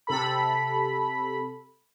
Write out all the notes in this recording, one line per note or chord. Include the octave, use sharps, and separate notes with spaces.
C3 A4 B5